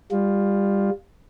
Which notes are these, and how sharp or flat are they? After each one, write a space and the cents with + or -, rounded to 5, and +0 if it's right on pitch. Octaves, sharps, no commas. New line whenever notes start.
G3 +20 F4 +5